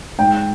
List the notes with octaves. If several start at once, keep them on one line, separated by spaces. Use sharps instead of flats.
G#2 G5